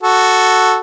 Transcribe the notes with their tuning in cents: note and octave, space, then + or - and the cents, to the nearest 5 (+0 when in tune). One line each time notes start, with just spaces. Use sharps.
F#4 +0 A4 +0